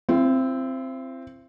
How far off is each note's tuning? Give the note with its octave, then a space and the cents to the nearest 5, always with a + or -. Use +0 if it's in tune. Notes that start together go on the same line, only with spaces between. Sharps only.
C4 +0 E4 +45